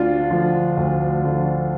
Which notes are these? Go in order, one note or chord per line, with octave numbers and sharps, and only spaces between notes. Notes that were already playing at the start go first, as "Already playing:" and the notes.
Already playing: D2 D4 F4
D3 F3
D2
D3 F3